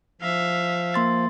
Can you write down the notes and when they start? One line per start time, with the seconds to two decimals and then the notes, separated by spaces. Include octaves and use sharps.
0.21 F3 E5 F5
0.94 A#3 C6 A6